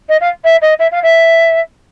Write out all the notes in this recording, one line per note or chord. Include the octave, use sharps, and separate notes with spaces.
D#5
F5
E5
D#5
E5
F5
E5